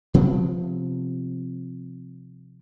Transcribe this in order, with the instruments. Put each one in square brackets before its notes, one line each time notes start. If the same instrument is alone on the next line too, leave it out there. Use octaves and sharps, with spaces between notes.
[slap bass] C3 F3 B3 C4